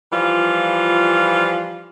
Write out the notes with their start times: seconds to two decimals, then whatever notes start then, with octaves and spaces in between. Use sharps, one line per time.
0.12 E3 F3 G3 F4